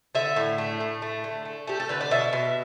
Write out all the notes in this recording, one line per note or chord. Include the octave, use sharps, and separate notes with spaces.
D3 E5
A2
A3
A2
A3
D3
A3
A3 G4
A4
D3 B4
D5
B2 E5
B2